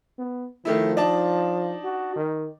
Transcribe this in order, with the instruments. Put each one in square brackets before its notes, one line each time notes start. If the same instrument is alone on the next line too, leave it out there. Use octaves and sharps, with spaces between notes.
[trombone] B3
[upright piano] D#3 A3 E4 [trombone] F3
[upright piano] D4 D#4 A5
[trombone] F#4
D#3